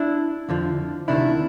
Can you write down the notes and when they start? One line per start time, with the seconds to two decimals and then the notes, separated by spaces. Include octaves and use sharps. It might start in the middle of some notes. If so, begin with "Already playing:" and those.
Already playing: D4 E4
0.49 F2 D3 F3
1.08 D2 C3 D#3 D4 E4